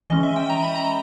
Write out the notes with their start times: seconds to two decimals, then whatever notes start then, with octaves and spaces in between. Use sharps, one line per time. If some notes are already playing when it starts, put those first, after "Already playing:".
0.10 E3 G#3 C#4 D#5
0.23 E5
0.36 G5
0.50 A#5
0.62 B5
0.76 A#5